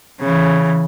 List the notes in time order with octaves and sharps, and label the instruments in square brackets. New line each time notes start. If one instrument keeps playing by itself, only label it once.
[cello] C#3 E3